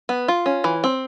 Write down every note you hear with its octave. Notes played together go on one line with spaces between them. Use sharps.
B3
F4
C#4
E3
C4